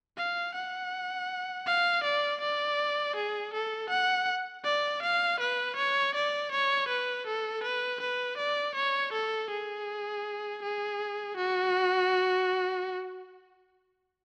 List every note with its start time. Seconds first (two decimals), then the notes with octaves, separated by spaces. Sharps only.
0.17 F5
0.55 F#5
1.66 F5
2.04 D5
2.41 D5
3.16 G#4
3.53 A4
3.90 F#5
4.65 D5
5.02 F5
5.40 B4
5.76 C#5
6.15 D5
6.52 C#5
6.88 B4
7.27 A4
7.63 B4
8.00 B4
8.38 D5
8.75 C#5
9.13 A4
9.50 G#4
10.62 G#4
11.37 F#4